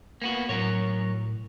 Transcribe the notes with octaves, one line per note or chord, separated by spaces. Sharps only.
A#3 B3 F#4
A2 F#3 A#4 C#5